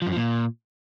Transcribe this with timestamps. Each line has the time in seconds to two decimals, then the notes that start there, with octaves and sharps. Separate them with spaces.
0.02 F3
0.07 F#2
0.12 F3
0.17 A#2